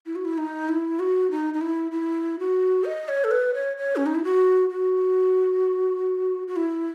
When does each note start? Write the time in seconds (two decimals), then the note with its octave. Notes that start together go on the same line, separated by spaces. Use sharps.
0.06 E4
0.16 F#4
0.25 E4
0.38 D#4
0.69 E4
0.99 F#4
1.31 D#4
1.54 D#4
1.61 E4
1.91 E4
2.39 F#4
2.85 D#5
3.09 C#5
3.24 A4
3.31 B4
3.54 C#5
3.77 C#5
3.96 C#4
4.06 D#4
4.15 E4
4.24 F#4
4.70 F#4
6.47 F#4
6.56 E4